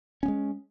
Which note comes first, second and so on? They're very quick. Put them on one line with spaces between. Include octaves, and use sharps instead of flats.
C#4 B3 G#3